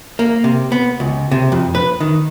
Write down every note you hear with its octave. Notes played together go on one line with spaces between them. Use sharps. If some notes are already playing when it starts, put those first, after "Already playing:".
A#3
C3
B3
C#2
C3
F2
B4
D#3